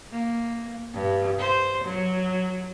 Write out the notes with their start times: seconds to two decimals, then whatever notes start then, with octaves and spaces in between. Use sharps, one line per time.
0.12 A#3
0.94 G2
1.38 C5
1.84 F#3